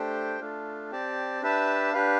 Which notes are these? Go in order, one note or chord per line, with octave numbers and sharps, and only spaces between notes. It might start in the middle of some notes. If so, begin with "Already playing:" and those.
Already playing: A3 D4 G4 C5 G5
A3 D4 F4
C4 G4 D5 A5
D4 G4 B4 E5 A5
D4 G4 B4 F5